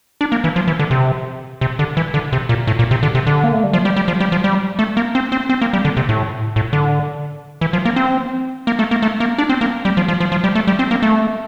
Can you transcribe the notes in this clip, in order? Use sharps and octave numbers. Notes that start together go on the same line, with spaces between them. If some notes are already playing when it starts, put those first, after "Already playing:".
D4
A#3
E3
F3
E3
D3
C3
C3
D3
E3
D3
C3
A#2
A2
A#2
C3
D3
C3
D3
A#3
A3
G3
F3
G3
G3
F3
G3
F3
G3
A3
A#3
C4
C4
C4
A#3
G3
D3
C3
A2
A2
D3
E3
F3
A#3
C4
A#3
A3
A#3
A3
A#3
D4
C4
A#3
G3
F3
F3
F3
F3
G3
A3
G3
C4
A#3
A3